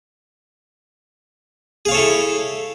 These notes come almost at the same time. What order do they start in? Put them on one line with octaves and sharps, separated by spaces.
G#4 F5 C#5 A4 E4